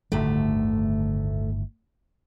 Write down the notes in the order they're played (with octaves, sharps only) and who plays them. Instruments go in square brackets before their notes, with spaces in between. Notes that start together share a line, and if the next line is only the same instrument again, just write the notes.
[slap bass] G1 A2 D#3 [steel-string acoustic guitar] D2 A3